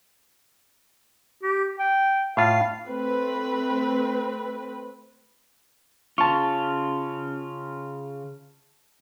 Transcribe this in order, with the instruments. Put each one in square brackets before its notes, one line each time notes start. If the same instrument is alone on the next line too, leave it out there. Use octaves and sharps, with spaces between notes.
[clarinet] G4
G5
[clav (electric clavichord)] A2 F4 [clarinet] F5
[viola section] A3 C4 B4
[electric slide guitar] C#3 C#4 F4 [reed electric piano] A5 C#6